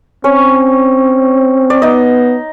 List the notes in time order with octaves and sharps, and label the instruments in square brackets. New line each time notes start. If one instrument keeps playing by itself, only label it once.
[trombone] C4 [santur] C#4 C#5
[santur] D5
[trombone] B3 [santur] D#4 D#5